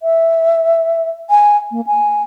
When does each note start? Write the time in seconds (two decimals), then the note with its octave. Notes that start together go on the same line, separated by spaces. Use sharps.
0.03 E5
1.30 G#5
1.71 A#3
1.87 G#5